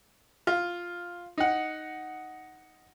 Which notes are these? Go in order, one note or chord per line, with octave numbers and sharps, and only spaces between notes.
F4
D#4 F#5